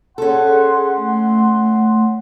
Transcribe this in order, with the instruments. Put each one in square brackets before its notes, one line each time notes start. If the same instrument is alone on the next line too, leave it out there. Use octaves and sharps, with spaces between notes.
[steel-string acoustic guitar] C#4 A4 [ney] G#4 [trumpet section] F#5 C6
[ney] A3